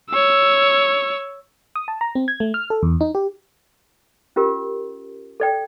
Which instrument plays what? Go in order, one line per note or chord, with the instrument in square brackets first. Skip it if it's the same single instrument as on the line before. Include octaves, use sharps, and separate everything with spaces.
[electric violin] C#5 E6
[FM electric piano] D#6
A5
A#5
C4
G#6
A3
F6
A4
E2
D#4
G4
[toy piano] C#4 F4 G4 A#4
A4 D5 G5